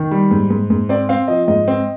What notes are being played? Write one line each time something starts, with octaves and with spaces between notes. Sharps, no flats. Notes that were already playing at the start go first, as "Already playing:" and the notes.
Already playing: D#3
G3
G#2
G#2
G#2
C4 D5
C4 F5
F3 D#5
G#2 D#5
C4